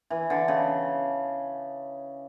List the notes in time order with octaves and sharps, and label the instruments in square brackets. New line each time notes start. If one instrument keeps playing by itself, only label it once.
[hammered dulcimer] E3
D3
C#3